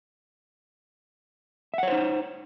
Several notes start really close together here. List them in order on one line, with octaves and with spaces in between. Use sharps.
E5 F#5 C#5 C5 D#4